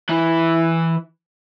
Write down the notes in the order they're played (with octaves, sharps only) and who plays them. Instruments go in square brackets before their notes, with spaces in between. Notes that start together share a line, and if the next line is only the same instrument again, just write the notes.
[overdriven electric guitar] E3 E4